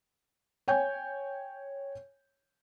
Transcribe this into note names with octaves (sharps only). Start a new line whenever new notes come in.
C#5 G5 G#5 G6